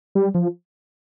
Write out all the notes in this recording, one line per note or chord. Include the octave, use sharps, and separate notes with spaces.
G3
F3